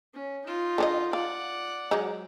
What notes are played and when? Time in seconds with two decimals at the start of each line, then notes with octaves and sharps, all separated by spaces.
0.14 C#4
0.46 D#4 F4
0.78 D3 C#4 D#5
1.13 F4 D5 F#5
1.91 F#3 G#3 D#4